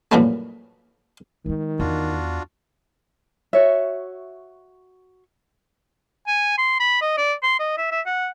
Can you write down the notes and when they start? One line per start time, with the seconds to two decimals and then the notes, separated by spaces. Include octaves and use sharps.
0.12 F#2 A#2 E3 G3 A3
1.46 D#3 G#3 D#4
1.80 E2 D4 F4 F#4
3.53 F#4 C#5 E5
6.27 G#5
6.58 C6
6.80 B5
7.01 D#5
7.17 D5
7.43 C6
7.59 D#5
7.77 E5
7.91 E5
8.06 F#5